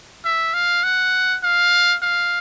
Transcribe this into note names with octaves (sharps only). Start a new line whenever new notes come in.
E5
F5
F#5
F5
F5